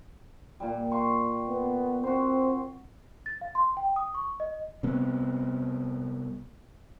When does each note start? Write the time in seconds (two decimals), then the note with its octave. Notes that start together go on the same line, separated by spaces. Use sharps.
0.60 A#2 G3
0.91 F5 C6 C#6
1.49 B3
2.03 C4 F#4 C5
3.26 A6
3.41 F5
3.55 C6
3.77 G5
3.96 D#6
4.14 C#6
4.40 D#5
4.83 C3 G3 B3 C4